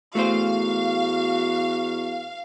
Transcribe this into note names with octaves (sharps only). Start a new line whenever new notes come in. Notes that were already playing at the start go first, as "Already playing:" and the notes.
E2 A3 F#4 C5 F5